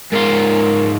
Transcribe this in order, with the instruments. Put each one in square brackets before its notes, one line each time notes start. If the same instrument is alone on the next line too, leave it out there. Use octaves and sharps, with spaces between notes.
[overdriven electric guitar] G#2 F4 [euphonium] A#4